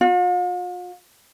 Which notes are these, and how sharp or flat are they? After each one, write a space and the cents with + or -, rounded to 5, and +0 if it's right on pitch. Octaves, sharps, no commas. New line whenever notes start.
F4 +45